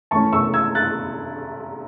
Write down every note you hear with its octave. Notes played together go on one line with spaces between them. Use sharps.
A2 E3 A3 C#4 A5 C#6
C#6 E6
E6 G#6
F#6 A6